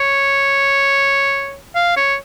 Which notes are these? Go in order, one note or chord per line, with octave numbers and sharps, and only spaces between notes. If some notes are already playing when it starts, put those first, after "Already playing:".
Already playing: C#5
F5
C#5